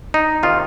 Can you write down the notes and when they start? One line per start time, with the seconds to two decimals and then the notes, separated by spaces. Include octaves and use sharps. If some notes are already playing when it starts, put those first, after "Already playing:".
0.14 D#4
0.43 C3 D#3 A#3 F4